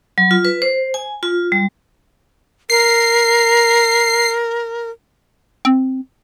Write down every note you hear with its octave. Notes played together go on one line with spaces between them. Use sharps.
F#3
F4
B4
C5
G#5
F4
G3
A#4 C7
C4